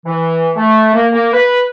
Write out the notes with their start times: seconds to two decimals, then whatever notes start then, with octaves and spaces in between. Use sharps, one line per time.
0.06 E3
0.56 A3
0.94 A#3
1.13 A#3
1.33 B4